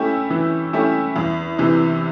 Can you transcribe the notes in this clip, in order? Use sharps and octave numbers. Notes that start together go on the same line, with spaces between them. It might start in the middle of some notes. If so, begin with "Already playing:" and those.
Already playing: A3 C#4 E4 G4
E3
A3 C#4 E4 G4
E2
C3 E3